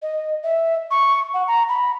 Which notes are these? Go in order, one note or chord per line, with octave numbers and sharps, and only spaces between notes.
D#5
E5
C#6
F#5
A#5
B5